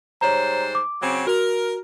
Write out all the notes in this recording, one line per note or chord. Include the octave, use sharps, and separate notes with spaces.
G#2 G3 C5 C#5 A#5
D6
C#3 F#3 C4
F#4 A#4